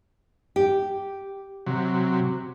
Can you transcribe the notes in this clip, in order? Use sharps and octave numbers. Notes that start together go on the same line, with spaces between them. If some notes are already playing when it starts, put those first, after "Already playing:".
G4
C3 F#3